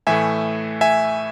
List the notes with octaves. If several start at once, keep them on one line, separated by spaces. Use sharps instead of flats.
A2 E3 A3 E5 G#5
E5 G#5